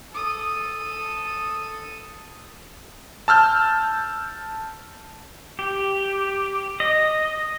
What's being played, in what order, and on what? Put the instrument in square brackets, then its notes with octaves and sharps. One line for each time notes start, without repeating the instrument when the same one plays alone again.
[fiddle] A4 D#6
[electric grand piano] A5 E6 F6 G6
[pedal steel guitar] G4
D#5